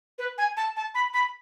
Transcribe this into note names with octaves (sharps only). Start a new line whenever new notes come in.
B4
G#5
A5
A5
B5
B5